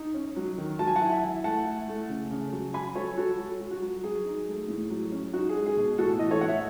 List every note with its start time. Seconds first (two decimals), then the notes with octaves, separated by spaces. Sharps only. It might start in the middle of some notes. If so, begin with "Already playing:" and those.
Already playing: D#4
0.14 C#4
0.36 F#3
0.58 D#3
0.79 F#3 A5
0.87 G#5
0.96 F#5 A5
1.01 E4
1.12 E5 G#5
1.22 E4
1.44 A3 F#5 A5
1.66 E4
1.88 A3
2.09 C#3
2.31 C#3
2.52 F#3
2.74 F#3 G#5 B5
2.95 F#3 A4 C#5
3.17 F#3 F#4 A4
3.39 F#3
3.60 F#3
3.71 F#4
3.82 F#3
4.03 F#3 G#4
4.25 D#4
4.47 A3
4.68 A2
4.90 F#3
5.12 C#4
5.33 D#4 F#4
5.49 G#4
5.55 G#3
5.66 G#4
5.77 B2
5.98 A2 F#4 A4
6.19 E3 D#5
6.31 A4 C#5
6.41 A2 F#5
6.48 E5